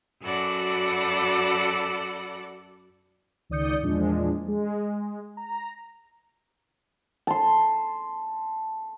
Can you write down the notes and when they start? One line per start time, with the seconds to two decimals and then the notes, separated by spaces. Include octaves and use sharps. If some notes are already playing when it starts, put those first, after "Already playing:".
0.22 F#2 F#4 A4 D5 F#5 B5
3.50 C#2 D#3 D5 D#6 G6 C#7
3.83 E2 A#2 F3 G#3 D4
4.48 G#3
5.37 A#5
7.27 A5 C6